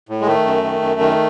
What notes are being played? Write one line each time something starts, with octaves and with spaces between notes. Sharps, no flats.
A2
G#3
D#3 A3
F#2
D#3
F#2
D#3